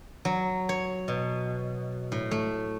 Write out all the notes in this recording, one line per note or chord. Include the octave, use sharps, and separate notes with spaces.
F#3
C#5
B2
A2
A3